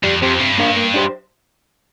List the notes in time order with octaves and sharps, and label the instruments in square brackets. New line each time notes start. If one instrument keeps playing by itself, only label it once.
[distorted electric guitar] F2 [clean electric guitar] G3
[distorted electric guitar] F2 [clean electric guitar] C4 G4 C5
[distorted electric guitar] G2 [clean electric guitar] C3
[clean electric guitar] A#3 D4 A#4 F5
A#3
D4 G4 C5